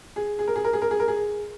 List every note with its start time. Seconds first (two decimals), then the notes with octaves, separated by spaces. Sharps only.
0.16 G#4
0.39 G#4
0.48 A#4
0.56 G#4
0.64 A#4
0.73 G#4
0.82 A#4
0.91 G#4
1.00 A#4
1.08 G#4